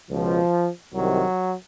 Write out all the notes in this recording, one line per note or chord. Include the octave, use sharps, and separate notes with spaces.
C#2 B2 F3
C2 C3 D#3 F#3